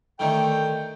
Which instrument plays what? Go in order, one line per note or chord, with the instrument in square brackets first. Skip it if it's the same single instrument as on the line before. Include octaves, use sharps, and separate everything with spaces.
[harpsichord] D3 D#3 A3 [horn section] G5